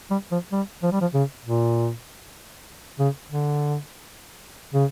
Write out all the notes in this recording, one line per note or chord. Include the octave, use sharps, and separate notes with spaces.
G3
F3
G3
F3
G3
F3
C#3
A#2
C#3
D3
C#3